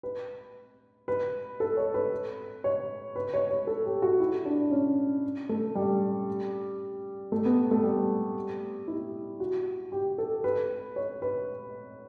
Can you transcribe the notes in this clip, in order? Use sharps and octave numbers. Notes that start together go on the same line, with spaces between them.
B4
B4
A4
C#5
B4
C#5
B4
C#5
C#5
A4
G4
F#4
E4
D4
C#4
A3
G3
A3
B3
A3
G3
E4
F#4
G4
A4
B4
C#5
B4